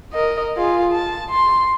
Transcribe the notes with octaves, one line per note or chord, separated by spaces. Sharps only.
A#4 D#5
F4 G#4
A5
C6